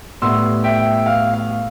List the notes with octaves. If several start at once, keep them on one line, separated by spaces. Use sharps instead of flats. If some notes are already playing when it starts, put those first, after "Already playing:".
A2 G3 B3 C6 E6
E5 G5
F5
F5